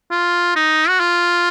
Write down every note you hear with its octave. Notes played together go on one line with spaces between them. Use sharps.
F4
D#4
F#4
F4